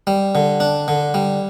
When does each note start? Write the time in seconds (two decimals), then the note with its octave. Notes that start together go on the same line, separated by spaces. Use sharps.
0.07 G3
0.35 D3
0.60 D4
0.88 D3
1.14 G3